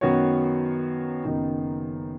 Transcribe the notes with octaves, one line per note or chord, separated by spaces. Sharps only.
F#2 D#3 B3 F#4 C#5
F#1 F#2 D#3 B3 D#4